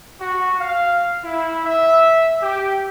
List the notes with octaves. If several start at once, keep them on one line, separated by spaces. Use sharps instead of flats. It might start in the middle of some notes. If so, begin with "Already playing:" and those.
F#4
F5
E4
E5
G4